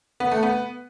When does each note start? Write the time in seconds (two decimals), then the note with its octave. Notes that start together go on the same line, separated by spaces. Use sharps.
0.20 B3
0.31 A3
0.43 B3